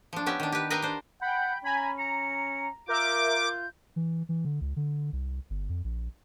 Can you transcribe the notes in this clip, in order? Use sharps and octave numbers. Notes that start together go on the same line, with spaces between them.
F3 D4
B3 C#4 G4 E5
D#3 D4
G4 B4
A#4 B4 D#5 F5 G5 A#5
D4 C5
F#5 G5 B5 G6
C#4 G#5 A#5 B5 G#6
A#5 C#7
F4 A#4 E5 D6 G6
E3
E3
D3
C#2
D3
C2
G1
F2
A#1